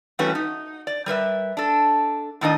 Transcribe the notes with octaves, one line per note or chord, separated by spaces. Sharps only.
E3 G3 A3 C#4 F#4 B4
D#4
D5
G3 A#4 B4 E5
D4 A4
A2 D#3 D4 D#5